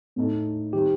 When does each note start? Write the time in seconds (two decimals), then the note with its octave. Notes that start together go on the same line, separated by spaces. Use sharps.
0.16 A2 A3 D#4 A4
0.73 D#3 G3 C4 G4